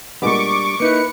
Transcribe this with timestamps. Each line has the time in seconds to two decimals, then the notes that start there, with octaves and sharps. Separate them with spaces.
0.22 A#2 G3 G#3 B3 D4 C#6 D6
0.80 A#3 D#4 E4 B4 C#7